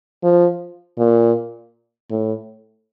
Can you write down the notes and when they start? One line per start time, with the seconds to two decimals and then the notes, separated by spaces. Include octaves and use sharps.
0.23 F3
0.98 A#2
2.10 A2